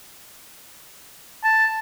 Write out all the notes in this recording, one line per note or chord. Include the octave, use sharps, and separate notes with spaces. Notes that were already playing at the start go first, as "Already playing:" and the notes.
A5